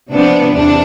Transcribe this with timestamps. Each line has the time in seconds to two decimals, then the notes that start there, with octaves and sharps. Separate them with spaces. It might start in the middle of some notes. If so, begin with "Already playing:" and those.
0.12 C3 F3 B3 D4
0.53 E2 C3 D4